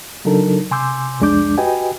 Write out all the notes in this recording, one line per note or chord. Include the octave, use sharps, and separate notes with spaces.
C#3 F#3 D4 D#4 A4 A#4
C3 G#5 C6 D6 E6 G6
C2 F2 G#3 D4 D6 G6
F#4 G4 B4 D#5 G5 G#5